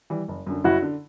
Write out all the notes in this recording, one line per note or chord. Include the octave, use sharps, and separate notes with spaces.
E3 G3
F#1
F#2 D3
F#1 E4 F#4
D3